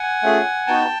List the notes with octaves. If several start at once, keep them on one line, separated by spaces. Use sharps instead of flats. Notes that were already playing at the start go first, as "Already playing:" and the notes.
Already playing: F#5 G#5
A3 C#4 F4 G#4
B3 D#4 F#4 G5 A5